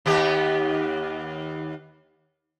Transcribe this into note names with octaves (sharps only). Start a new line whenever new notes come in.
D#2 B3 G4